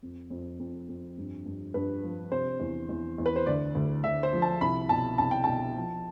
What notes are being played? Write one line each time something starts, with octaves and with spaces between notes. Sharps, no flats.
F2
F2
F2
F2
G2
G2
G2 B4
F3
C3 C5
E2
E2
E2
B4
C5
D2 D5
D2
D2 E5
C5
F3
A5
C2 B5
B2 A5
C2 A5
G5
B2 A5
F3